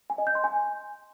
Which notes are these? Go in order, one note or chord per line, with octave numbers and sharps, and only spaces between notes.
G#5
D#5
G6
C6
G#5